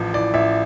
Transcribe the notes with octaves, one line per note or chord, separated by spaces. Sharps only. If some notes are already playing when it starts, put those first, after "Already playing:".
Already playing: A1 F3
E3 D5
A1 E5